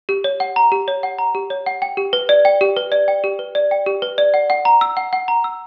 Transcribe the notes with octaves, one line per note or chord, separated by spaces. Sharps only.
G4
C#5
F#5
A#5
G4
C#5
F#5
A#5
G4
C#5
F#5
G5
G4
B4
D5
G5
G4
B4
D5
G5
G4
B4
D5
G5
G4
B4
D5
F#5
F#5
A#5
E6
F#5
F#5
A#5
E6